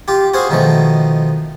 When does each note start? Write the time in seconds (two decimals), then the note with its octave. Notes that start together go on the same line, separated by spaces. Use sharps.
0.08 F4 G4
0.34 F#4 G#4 C5 F5
0.49 B2 D#3 F3 A3